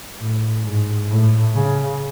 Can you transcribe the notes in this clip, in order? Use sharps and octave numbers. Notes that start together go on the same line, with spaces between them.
A2
G#2
A2
C#3